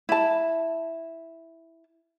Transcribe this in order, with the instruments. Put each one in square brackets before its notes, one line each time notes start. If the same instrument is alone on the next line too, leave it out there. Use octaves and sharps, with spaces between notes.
[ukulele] E4 A5